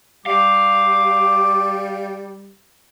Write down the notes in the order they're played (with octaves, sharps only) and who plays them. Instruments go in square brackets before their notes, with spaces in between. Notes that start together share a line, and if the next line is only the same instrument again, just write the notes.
[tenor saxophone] G3 [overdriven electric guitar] F5 [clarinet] D6